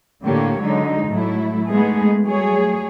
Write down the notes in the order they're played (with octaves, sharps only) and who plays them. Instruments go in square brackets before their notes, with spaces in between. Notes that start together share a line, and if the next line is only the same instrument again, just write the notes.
[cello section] A2 D3 A#3 G4 C#5
D3 F#3 G#3 D#4
A2 F#3 A3 E4
G#3 A3 B3 D#4 G#4
F#3 G3 A3 G#4 C#5